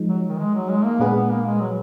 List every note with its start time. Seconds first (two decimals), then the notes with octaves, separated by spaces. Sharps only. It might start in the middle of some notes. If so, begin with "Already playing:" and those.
Already playing: F3 G#3 D#4
0.09 F#3
0.29 D#3
0.39 G#3
0.55 F#3
0.70 G#3
0.84 A#3
1.00 A#2 G#3 B3 D4 G#4 B4
1.16 B3
1.31 A#3
1.46 G#3
1.61 F#3